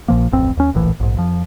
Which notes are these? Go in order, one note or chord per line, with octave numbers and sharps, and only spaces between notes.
A#1 A#2 F3 A#3
D1 A1 F2 C4
D#2 C#4
D1 A#1 A2 E3
A#1 G#2
F2 F3